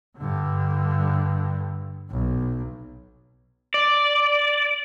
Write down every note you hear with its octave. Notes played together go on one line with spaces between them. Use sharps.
G2 D3
B1
D5